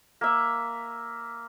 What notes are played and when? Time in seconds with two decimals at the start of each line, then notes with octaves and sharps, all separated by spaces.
0.21 A#3 E5